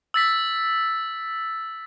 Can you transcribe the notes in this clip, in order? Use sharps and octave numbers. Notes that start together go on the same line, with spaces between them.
E6 A6 B6